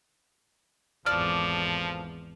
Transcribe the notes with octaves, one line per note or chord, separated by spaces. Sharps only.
G#1 E2 F3 A4 D5 D6 F6